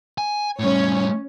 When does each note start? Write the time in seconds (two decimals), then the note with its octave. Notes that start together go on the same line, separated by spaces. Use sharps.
0.18 G#5
0.60 A2 G3 C#4 C#5